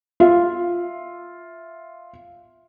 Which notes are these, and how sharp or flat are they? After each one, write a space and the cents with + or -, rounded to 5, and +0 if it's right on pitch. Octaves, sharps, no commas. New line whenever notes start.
F4 +0 E5 +0